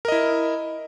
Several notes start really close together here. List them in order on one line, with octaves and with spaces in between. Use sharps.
A#4 D#5 E4